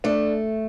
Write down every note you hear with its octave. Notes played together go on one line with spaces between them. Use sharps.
A3 D4